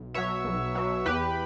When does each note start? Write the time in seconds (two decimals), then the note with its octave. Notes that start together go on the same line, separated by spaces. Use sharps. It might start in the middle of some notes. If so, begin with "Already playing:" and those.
Already playing: B1
0.14 B2 F#3 C#5 E5
0.45 B1
0.75 B2 F#3
1.06 E2 G4 B4